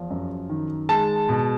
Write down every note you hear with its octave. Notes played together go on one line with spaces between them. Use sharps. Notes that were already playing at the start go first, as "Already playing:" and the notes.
Already playing: E2 F3
F#2
D#3
G#3 A5
B2